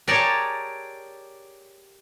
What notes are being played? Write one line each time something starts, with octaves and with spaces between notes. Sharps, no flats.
G4 G#4 A#4 C#5 D5 A5